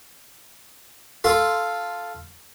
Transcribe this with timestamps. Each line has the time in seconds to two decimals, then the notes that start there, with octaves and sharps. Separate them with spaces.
1.24 F4 A4 C6